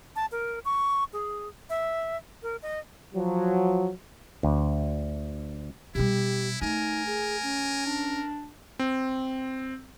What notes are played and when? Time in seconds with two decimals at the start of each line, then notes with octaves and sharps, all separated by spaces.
0.16 A5
0.32 A#4
0.65 C#6
1.13 G#4
1.70 E5
2.43 A#4
2.62 D#5
3.14 F3 F#3
4.43 D2
5.95 B2 G3 E4 G4
6.62 A3 D#4 A#4 G#5
7.07 G#4
7.43 C#4
7.86 D4
8.79 C4